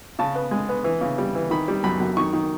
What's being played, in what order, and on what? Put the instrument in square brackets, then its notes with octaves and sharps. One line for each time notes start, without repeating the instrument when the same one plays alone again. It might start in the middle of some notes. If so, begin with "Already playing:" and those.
[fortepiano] C#3 A5
B3
G#3
B3
E3
C#3
G3
E3
D#3 B5
G3
F#2 B5
F#2
D#3 C#6
D#3